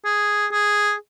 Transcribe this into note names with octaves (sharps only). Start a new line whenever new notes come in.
G#4
G#4